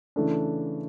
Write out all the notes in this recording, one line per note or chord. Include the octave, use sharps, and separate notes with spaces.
C#3 E3 A3 D4